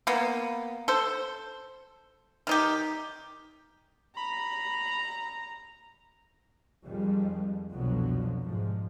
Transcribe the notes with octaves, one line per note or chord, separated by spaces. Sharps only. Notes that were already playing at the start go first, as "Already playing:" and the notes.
A#3 B3
A4 C5
D#3 D#4 G4
A#5 B5
F2 D#3 G3 G#3
C2 F2 B2 D3 F3 F#3
G#2 C3 F3